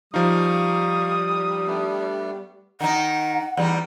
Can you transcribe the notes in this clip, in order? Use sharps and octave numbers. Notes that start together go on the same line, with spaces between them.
F3 G3 D#4 F5 C#6 D#6
A3 B3 D4
D#3 D#4 F#5
E2 G3 D#4